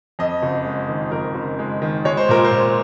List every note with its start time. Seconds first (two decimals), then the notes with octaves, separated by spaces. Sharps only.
0.19 F2 D#5
0.42 F#1
0.65 G#3
0.89 D#3
1.11 F2 A#4
1.35 F#1
1.59 G#3
1.82 D#3
2.05 G#3 C#5
2.17 C5
2.29 A#2 A#4
2.45 C5
2.51 A#2